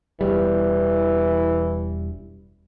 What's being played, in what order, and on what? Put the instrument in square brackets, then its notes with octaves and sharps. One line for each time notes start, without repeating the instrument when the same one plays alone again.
[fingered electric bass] E1 G3 [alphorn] E3